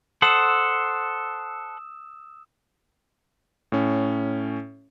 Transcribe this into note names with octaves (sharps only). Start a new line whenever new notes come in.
A4 C5 F#5 D#6 E6 E7
A2 C#4